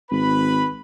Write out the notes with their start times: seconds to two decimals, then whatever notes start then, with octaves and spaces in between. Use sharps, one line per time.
0.11 G#1 B4 B5